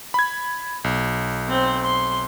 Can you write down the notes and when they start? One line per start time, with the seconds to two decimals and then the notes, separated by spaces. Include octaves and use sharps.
0.14 B5 G#6
0.84 B1
1.48 C4 C5
1.83 C6